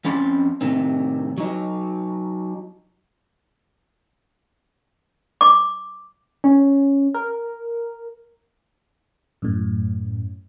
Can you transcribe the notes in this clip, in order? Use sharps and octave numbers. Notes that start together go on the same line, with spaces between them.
F2 C4 C#4 B5 C6
A2 C3 D#3 C4
F#3 D#4
D6
C#4
A#4
F#2 A2